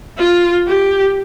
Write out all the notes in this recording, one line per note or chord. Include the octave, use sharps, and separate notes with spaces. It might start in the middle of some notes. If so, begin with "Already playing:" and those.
F4
G4